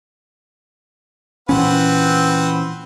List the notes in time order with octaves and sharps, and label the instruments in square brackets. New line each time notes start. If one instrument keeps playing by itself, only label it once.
[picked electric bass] A#2 E3 C#4 [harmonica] C4 B4 F#5